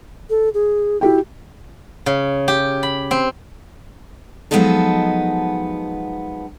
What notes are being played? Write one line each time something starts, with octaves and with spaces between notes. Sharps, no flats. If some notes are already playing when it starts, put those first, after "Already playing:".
A4
G#4
E4 F#4 G4 G5
C#3
G4
B5
C4
F3 F#3 G#3 B3 D#4 A4